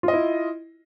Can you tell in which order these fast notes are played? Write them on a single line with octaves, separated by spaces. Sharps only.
F4 D#5 E4